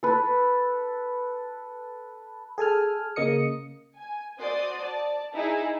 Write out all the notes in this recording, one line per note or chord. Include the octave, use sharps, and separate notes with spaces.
A4 B4
G#4 A4 G#5 F6
C#3 A#3 D#5 D#6 C#7
G#5
F#4 C5 D5 C6 D#6
D5 A5
D#4 E4 G#4